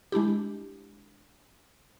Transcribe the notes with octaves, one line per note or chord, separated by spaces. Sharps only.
G#3 D4 E4 G4